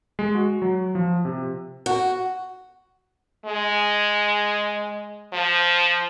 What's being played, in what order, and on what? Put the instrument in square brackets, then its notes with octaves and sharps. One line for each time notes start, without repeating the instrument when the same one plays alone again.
[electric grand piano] G#3
F#4
F#3
F3
C3
[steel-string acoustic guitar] F#4
[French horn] G#3
F3